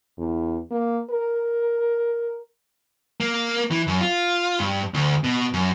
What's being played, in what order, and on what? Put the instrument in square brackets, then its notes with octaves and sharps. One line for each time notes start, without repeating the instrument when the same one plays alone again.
[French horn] E2
A#3
A#4
[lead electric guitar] A#3
E3
F#2
F4
G2
D2
B2
F#2